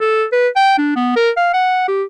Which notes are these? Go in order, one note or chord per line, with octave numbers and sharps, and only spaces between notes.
A4
B4
G5
D4
B3
A#4
F5
F#5
G4